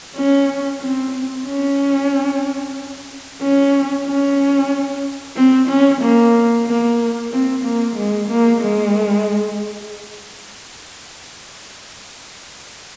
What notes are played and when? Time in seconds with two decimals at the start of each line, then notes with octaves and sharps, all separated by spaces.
0.16 C#4
0.81 C4
1.45 C#4
3.42 C#4
4.06 C#4
5.36 C4
5.69 C#4
6.01 A#3
6.66 A#3
7.31 C4
7.65 A#3
7.96 G#3
8.29 A#3
8.61 G#3